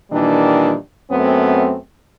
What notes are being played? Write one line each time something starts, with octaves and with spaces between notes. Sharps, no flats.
A#2 D#3 E3 G3 D4
F#2 A3 B3 C4